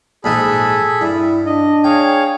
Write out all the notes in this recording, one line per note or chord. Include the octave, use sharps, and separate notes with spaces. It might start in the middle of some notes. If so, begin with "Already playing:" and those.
A#1 G#2 D#4 G#4 A4 B5
G2 E4
D4 D#5
G#4 C#5 F5 G5